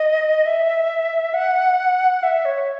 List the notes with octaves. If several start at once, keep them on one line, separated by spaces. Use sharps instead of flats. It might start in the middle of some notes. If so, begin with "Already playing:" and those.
Already playing: D#5
E5
F#5
E5
C#5